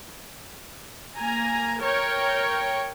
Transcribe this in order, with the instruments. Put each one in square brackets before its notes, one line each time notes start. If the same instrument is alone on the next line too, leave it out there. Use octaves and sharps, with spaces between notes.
[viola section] A#3 G#5 A#5
A#4 C#5 G5